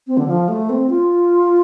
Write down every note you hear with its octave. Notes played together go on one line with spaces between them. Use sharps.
C4
D3
F3
A3
C4
F4